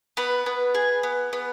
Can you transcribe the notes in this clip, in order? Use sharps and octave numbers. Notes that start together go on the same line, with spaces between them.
B3 B4
B3
G#4
B3
B3